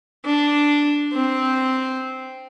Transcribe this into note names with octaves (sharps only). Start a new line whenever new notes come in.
D4
C4